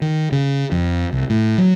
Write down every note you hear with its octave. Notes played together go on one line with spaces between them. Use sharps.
D#3
C#3
F2
C2
A2
F#3